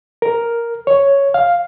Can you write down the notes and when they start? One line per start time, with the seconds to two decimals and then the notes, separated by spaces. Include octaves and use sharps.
0.22 A#4
0.87 C#5
1.34 F5